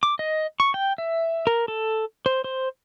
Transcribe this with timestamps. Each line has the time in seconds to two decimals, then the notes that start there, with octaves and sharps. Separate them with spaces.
0.03 D6
0.19 D#5
0.60 C#6
0.74 G5
0.98 E5
1.47 A#4
1.68 A4
2.26 C5
2.44 C5